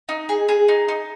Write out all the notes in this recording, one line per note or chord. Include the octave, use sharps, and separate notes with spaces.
D#4
G#4
G#4
D#4
D#4